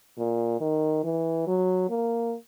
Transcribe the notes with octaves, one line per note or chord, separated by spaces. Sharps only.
A#2
D#3
E3
F#3
A#3